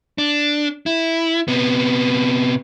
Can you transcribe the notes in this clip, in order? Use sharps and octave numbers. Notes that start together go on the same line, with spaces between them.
D4
E4
C3 B3